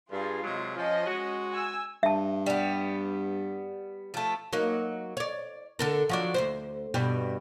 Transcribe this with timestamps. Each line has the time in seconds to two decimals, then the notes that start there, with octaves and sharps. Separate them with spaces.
0.11 G2 F4 G#4
0.43 C3 F#3 G#3
0.75 F3 C#4 D#5
1.07 G#3 F#4
1.51 G#5 E6
2.03 G2 E5 A5
2.46 G3 B3
4.14 F3 A3
4.53 F#3 A#3 D#4
5.17 C#5 D5
5.79 D3 A4 A#4
6.09 F3 F#3 D4
6.34 D2 G2 C5
6.94 G2 B2 G3